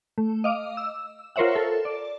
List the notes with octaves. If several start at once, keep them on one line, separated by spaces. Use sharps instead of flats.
A3
D#5 F5 D6
E6
F4 A#4 C5 C#5 E5 F#5
A4
D5